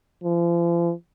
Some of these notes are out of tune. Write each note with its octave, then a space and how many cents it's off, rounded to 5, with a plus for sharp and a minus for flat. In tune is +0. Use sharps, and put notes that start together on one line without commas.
F3 -40